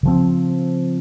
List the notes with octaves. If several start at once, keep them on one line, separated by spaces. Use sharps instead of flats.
C#3 F3 C4